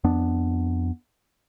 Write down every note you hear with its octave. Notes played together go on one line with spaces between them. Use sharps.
F2 B3 D4